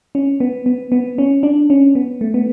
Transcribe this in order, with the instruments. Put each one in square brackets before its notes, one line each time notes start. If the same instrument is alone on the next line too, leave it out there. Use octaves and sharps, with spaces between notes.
[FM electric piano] C#4
B3
B3
B3
C#4
D4
C#4
B3
A3
B3